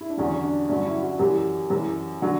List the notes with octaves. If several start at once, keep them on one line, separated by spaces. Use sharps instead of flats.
E4
D4
E2 D3 F#3 C#4
D4
G2 D3 F#3 C#4
E4
F#4
F#2 E3 G4
F#2
E3
D3 F#3